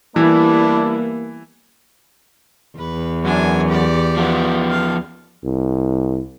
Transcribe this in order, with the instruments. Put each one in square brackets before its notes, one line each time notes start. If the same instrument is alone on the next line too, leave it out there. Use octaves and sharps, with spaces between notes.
[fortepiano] E3 [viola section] G3 B3 E4 [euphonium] A#3 [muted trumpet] D4
[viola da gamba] E2 [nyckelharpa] B4
[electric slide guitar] F#2 [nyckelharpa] D4 G#5
[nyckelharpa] G4 D5
[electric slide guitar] F3 B3
[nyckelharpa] F4 F5
[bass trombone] C2